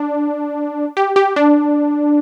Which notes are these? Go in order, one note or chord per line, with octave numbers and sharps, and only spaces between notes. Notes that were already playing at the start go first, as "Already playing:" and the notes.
Already playing: D4
G4
G4
D4